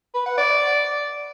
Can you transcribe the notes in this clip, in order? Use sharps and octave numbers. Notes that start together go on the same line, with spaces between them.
B4
F#5
D5